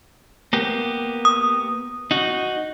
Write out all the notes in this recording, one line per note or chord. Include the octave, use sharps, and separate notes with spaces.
A#3 B3 G4
D#6
D#4 F#4